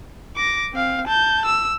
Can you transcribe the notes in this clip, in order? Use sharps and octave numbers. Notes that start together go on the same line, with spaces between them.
D6 A#6
C4 F5
A5 G6
E6